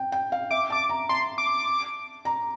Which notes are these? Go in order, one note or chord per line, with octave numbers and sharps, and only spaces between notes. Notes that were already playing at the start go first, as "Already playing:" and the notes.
Already playing: G5
G5
F5
E5 D6
A5 D6
A#5
A5 C6
D6
A#5